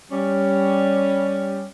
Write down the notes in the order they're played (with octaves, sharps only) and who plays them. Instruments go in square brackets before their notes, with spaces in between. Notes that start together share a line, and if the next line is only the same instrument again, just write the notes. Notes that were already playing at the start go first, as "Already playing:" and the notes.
[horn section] G3 C#4